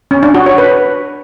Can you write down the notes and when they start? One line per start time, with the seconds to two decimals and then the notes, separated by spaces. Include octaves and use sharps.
0.11 C#4
0.23 D4
0.35 F#4
0.46 C#5
0.58 B4